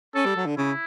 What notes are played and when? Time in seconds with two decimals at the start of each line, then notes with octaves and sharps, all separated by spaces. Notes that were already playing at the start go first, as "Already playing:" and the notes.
0.15 C#4 A4
0.25 G3
0.36 F#3
0.46 D3
0.57 C#3 E4